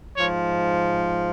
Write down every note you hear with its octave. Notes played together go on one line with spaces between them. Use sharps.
G#2 F3 C#5